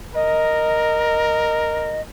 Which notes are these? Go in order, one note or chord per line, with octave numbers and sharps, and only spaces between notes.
A#4 D#5